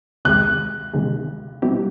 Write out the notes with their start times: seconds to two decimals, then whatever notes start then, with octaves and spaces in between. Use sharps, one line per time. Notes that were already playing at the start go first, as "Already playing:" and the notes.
0.25 C3 D#3 G#3 F#6
0.94 C3 D#3 G#3
1.62 B2 G3 C4 E4 G4